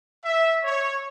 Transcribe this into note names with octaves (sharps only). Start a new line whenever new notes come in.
E5
C#5